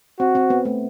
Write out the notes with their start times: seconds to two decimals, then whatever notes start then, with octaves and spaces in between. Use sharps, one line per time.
0.20 C4 F#4
0.35 C4
0.50 B3
0.65 A3